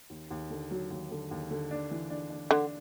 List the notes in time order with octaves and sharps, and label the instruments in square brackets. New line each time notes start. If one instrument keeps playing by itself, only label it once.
[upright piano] D#2
D#2
D3
F#3
D#2
D3
D#2
D3
D4
E3
D4
D4
[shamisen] D3 [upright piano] D4